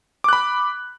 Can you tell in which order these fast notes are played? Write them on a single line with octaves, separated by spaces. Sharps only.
D6 F#6 B5